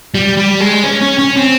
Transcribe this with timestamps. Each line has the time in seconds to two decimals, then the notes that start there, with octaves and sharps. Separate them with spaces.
0.15 G3
0.37 G3
0.61 G#3
0.84 C#4
1.02 C#4
1.19 C#4
1.37 C4